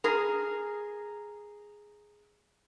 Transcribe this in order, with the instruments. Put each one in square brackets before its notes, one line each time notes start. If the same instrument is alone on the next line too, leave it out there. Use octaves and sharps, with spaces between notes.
[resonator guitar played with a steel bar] G#4 A#4